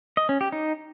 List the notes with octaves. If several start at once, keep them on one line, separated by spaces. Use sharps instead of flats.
D#5
C#4
G4
D#4